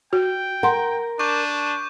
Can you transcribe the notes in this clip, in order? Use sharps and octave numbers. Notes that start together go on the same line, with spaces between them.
F#4 G5
A#4 F#5 C6
D4 C#6 D6 G6